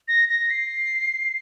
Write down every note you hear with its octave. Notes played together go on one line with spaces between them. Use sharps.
A#6
A#6
C7